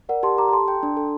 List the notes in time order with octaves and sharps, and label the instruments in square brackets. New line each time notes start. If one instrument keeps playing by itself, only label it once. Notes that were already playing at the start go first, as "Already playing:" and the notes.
[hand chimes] A#4 [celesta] D5 F#5
[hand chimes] G4 [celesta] A5 C6
[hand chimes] G4 [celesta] A#5 D6
[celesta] A#5
[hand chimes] A4 [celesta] A5 C6
[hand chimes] G5
D4
A4